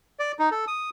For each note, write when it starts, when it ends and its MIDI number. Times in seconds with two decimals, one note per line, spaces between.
0.19 0.32 74
0.39 0.49 63
0.51 0.65 69
0.68 0.90 87